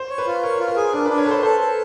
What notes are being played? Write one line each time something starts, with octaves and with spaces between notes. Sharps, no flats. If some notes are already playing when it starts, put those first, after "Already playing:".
Already playing: C5
C#5
B4
F4
A#4 C#5
F4
A#4
G#4
D4 A#4
D4 B4
C#5
A4 B4 C5
A4 C5
A4